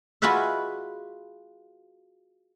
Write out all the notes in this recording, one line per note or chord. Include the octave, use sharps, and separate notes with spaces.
F4 F#4 G#4 B4 D#5 E5